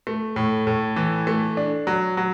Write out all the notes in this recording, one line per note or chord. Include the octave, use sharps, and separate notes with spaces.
A3
A2
A2
E3
A3
D4
F#3
F#3